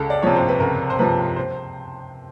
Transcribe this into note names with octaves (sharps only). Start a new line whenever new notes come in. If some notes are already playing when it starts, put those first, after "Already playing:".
Already playing: C#2 A4
D5
C3 F3 C#5
C5
B4
C#2 A#4
C5
C3 F3 B4
C5